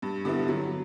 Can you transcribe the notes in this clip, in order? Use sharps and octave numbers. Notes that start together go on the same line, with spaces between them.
G2
D3 G3 B3 E4
F#3